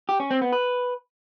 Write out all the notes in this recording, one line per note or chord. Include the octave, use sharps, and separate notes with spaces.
G4
C#4
C4
B3
B4